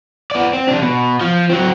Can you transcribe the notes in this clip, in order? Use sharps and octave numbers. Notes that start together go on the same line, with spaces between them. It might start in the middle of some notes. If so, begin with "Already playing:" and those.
B3 D5
C4
C3 D4
B2
F3
F#3 C4